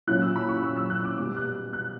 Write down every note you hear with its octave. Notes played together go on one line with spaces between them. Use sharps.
A#2 F#3 C#4 E4 F#6
E6
B5
C#6
E6
E6
F#6
D6
B2 G3 B3 D6
F#6
F#6